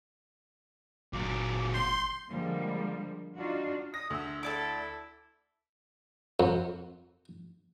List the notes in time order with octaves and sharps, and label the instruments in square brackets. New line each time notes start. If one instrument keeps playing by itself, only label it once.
[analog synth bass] G1 [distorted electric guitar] A#2 F#3 [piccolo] D6
[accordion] C6 [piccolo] G6
[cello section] D3 F3 G3 G#3 A#3
D4 D#4 F4 F#4
[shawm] D#6 [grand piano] A#6
[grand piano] D2 E6 [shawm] E5
[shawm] E4 [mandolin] A4 D5 D6
[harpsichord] F2